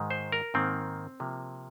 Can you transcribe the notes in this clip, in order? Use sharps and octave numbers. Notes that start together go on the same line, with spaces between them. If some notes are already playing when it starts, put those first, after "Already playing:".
Already playing: G#2 D#3 G#3
C5
A#4
G#2 D#3 A#3 C4
C3 F3 A#3